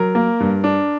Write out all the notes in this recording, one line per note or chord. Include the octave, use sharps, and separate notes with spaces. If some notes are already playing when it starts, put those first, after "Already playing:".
Already playing: F#3 A#4
A#3
G2
D4